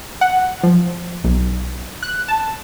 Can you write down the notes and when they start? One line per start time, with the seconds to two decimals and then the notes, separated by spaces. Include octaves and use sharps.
0.21 F#5
0.63 F3
1.24 B1
2.03 F#6
2.28 A5